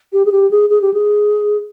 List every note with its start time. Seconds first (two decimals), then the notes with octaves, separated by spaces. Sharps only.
0.13 G4
0.25 G#4
0.32 G4
0.51 G#4
0.70 G#4
0.82 G4
0.94 G#4